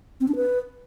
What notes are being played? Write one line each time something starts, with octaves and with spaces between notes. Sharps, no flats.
C4
D4
B4